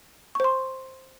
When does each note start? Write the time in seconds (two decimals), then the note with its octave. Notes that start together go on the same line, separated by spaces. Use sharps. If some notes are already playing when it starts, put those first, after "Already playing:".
0.35 C#6
0.40 C5
0.44 C6